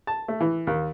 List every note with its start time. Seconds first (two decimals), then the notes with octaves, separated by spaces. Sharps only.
0.07 A5
0.28 A3
0.41 E3
0.67 D#2